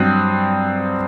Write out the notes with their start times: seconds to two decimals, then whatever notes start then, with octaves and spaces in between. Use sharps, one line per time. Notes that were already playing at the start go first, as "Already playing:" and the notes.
Already playing: G2 F#3 C4 D#6 F#6